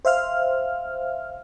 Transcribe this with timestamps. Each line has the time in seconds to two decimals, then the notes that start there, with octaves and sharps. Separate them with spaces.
0.05 C5 E5 F5 F6